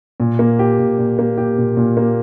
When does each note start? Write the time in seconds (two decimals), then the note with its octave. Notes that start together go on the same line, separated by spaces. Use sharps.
0.20 A#2
0.39 A#3
0.59 G4
0.79 A#2
0.98 A#2
1.19 A#3
1.38 G4
1.58 A#2
1.77 A#2
1.97 A#3